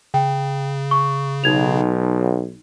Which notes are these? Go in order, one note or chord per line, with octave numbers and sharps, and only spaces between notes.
C#3 G5
C#6
B1 D#4 G#6 F7